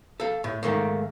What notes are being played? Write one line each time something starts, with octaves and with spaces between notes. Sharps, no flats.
A4 F5
A2
G#2 D#3 A3 A#3